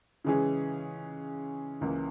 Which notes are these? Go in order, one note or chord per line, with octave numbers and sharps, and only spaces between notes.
C#3 E3 G#3 C#4 G#4
C#2 C#3 E3 A#3 C#4